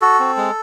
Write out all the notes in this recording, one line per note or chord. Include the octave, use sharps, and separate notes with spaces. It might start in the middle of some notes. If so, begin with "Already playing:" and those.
F#4 A4
C4
G#3